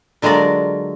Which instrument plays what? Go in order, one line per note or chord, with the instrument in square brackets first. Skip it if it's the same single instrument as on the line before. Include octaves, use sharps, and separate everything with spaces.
[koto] D3 F#3 G#3 F4 A#4 D5